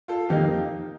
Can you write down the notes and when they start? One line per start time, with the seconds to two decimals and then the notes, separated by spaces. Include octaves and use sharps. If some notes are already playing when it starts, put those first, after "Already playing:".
0.08 F4 A4
0.29 F2 D#3 A#3 D#4 G4